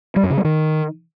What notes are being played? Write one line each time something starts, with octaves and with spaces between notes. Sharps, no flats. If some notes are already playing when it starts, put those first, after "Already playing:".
G3
F#2
C#3
G3
D#3